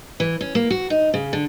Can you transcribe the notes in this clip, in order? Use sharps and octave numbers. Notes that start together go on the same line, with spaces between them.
E3
C#4
A#3
F#4
D#4
C#3
D3